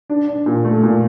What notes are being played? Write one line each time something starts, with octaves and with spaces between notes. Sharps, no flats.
D4
D4
A#2
A3
A#2